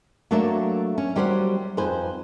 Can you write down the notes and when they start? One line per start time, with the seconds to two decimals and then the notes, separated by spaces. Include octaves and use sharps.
0.31 F#3 A3 A#3 D4 A4 E5
0.98 C#4
1.16 F#3 G3 G4 C5 F5 F#5
1.77 F2 D#4 B4 C5 G#5